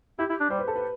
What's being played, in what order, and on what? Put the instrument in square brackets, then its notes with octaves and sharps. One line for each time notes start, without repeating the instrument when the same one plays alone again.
[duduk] E4 [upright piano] G4
[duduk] E4
D4
[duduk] G3 [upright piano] C5
[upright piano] B4
A4
B4